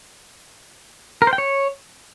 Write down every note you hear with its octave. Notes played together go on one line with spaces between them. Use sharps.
A#4
C5
G5
C#5